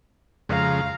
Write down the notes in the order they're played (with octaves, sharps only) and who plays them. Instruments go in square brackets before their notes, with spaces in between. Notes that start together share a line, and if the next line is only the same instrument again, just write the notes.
[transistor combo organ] F2 C#3 G#3 [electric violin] F5 A#5